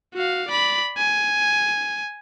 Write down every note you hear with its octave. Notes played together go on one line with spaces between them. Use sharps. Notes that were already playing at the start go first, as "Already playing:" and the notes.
F#4 F5
D5 B5
G#5